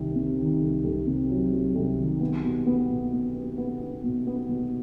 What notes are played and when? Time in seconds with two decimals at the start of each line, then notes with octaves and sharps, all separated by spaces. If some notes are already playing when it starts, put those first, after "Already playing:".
Already playing: C2 C3 D#3
0.15 C3
0.39 D#3
0.61 C2
0.84 C2
1.07 C3
1.30 F#3
1.52 F#3
1.75 C2
1.98 D#3
2.20 B3
2.44 B2
2.66 B3
2.89 B2
3.13 B3
3.35 B3
3.58 B3
3.81 B3
4.04 B2
4.27 B3
4.49 B2